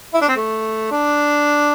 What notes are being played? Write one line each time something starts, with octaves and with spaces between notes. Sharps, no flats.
E4
D4
C4
A3
D4